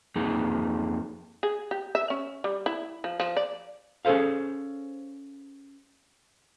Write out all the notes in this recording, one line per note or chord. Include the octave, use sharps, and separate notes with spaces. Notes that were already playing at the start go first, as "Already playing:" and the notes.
F2 A#3 D#4 G#4
G#4
G4
E5
C#4
G3
E4
F3
F3
D5
C#4 G#4 A4 C5 F5